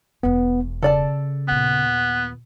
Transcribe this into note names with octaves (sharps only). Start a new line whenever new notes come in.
E1 E2 B3
C#3 A4 D5 A5
D#2 A#2 B3